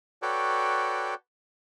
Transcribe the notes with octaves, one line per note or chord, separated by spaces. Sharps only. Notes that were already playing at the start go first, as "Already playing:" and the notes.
F#4 A4 B4 C#5 D5 G5